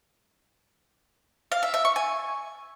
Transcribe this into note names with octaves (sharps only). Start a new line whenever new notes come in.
F5
E5
E5
C#6
G#5